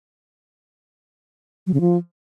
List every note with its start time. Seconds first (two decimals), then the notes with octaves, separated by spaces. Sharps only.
1.67 F#3
1.74 C#3
1.81 F3